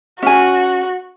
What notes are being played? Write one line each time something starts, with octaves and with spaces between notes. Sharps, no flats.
C#4 F#4 G#5